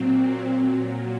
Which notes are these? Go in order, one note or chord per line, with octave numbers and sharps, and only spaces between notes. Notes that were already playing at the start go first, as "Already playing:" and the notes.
Already playing: A#2 F#3 C4
A#2 F#3